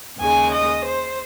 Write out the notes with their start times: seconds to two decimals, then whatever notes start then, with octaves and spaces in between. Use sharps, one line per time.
0.19 D#2 C#3 G#3 G#5
0.52 D#5
0.84 C5